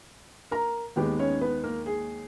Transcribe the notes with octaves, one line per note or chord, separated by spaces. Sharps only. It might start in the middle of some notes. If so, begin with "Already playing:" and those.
A#4 A#5
D#2 D#3 G#3 B3 G4 G5
C#4 C#5
B3 B4
A#3 A#4
G#4